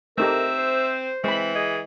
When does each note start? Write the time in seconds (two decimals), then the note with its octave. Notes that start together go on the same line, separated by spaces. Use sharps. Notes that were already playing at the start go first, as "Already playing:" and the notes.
0.18 A3 C4 D#4 G4 A#4 E5
0.58 C5
1.24 E3 G#3 C4 B5
1.55 G#4 D#5